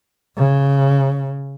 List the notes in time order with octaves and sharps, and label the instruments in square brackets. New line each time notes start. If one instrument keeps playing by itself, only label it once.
[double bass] C#3